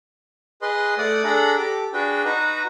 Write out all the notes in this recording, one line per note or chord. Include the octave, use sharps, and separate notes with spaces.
G#4 B4 D#5 C6
A3 D5 F#5 D#6
D4 G#4 A4 F#5 A#5 B5
G4 A4 D6
D4 F#4 G#4 B4 G5
D#4 F#4 B4 A#5